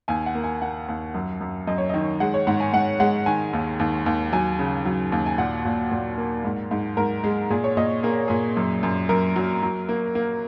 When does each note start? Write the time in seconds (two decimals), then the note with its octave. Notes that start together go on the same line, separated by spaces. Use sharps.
0.08 D#2 G#5
0.26 F#5
0.35 A#3
0.44 G#5
0.62 A#3 F#5
0.88 D#2
1.14 F#2
1.41 F#2
1.67 F#2 D#5
1.78 C#5
1.89 D#3 D#5
2.20 G#3 F#5
2.34 C#5
2.47 G#2 F#5
2.60 G#5
2.73 G#2 F#5
3.00 G#3 F#5
3.26 D#3 G#5
3.53 D#2
3.79 D#2
4.06 D#2
4.32 F#3 G#5
4.59 C#3
4.85 F#3
5.12 D#2
5.26 G#5
5.38 A#2 F#5
5.65 A#2
5.91 A#2
6.18 A#3
6.44 G#2
6.71 G#2
6.97 G#2 A#4
7.24 G#3
7.50 A#2 G#4
7.64 C#5
7.77 A#2 D#5
8.03 A#3 G#4
8.28 A#2 G#4
8.57 F#2
8.83 F#2
9.09 F#2 A#4
9.36 F#3
9.62 F#3
9.89 A#3
10.15 A#3